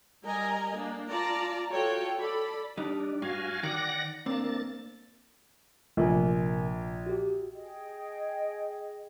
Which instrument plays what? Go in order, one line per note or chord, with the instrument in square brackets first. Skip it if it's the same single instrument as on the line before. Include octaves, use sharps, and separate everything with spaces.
[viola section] G3 A#4 D#5 G#5 A#5
A#3 D4
F4 D5 A5 A#5
F4 F#4 A4 C#5 G5
A4 D5 B5
[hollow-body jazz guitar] G3 D#4 [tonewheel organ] D4
[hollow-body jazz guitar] G2 [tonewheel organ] F#4 F5 G#5
[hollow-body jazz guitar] D#3 [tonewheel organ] D5 F#5 A#6
[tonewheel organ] A#3 A6 [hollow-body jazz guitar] C4 D4
[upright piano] A#1 [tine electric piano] C3 A#4 G#5
[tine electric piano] F#4 G4
[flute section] G#4 D#5 G5